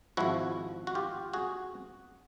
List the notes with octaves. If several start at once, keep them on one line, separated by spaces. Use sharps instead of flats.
G#1 G#2 F3 E4 F#4
F#4
F4 G4
F#4 G#4